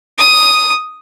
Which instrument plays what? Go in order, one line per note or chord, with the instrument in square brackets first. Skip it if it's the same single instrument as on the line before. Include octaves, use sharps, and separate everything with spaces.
[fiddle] D#6